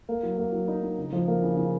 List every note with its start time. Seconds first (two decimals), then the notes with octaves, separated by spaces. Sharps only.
0.09 A#3
0.23 F#3
0.38 A#3
0.52 F#3
0.68 D#4
0.83 D#4
0.98 C#3
1.12 F3
1.28 A#3
1.42 C#3
1.57 C#3